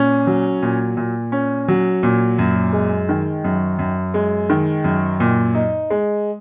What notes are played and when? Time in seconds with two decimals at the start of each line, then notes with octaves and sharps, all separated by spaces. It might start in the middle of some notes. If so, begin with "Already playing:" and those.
Already playing: A#2 C#4
0.27 F#3
0.62 A#2
0.97 A#2
1.32 C#4
1.68 F#3
2.03 A#2
2.39 F#2
2.73 G#3
3.09 D#3
3.44 F#2
3.79 F#2
4.14 G#3
4.50 D#3
4.84 F#2
5.20 A#2
5.55 D#4
5.90 G#3